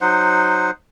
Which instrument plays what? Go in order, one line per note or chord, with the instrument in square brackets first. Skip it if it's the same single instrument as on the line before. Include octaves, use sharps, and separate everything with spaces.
[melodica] F#3 D#4 C5 F#5